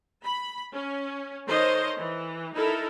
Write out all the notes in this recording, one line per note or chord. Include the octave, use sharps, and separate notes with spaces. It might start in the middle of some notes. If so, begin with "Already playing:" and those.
B5
C#4
D#3 A4 C5 C#5 D#5
E3
D#4 E4 A4 A#4